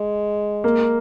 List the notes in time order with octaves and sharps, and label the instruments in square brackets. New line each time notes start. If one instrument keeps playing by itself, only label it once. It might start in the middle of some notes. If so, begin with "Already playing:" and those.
Already playing: [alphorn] G#3
[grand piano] A#3